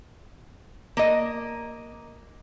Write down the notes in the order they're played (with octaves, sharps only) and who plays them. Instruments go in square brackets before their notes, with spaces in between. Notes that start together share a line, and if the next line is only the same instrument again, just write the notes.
[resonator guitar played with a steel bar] A#3 D#5